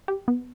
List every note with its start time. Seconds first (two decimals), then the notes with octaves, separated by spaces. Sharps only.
0.08 G4
0.28 B3